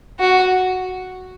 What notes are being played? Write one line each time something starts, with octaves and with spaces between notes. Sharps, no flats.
F#4